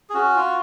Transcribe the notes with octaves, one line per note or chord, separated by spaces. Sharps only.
G#4
C#4 F#4
F4